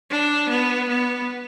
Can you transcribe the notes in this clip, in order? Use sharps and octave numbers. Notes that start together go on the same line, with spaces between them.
D4
B3
B3